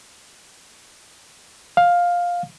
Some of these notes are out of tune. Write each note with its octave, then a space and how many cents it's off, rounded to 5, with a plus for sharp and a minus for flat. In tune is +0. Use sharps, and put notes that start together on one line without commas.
F5 +10